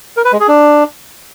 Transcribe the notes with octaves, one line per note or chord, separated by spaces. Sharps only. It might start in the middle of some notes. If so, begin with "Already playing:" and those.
A#4
B4
G#3
G#4
D4